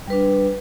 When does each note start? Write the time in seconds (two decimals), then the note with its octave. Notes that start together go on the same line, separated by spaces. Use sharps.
0.07 G3
0.10 B4
0.13 D4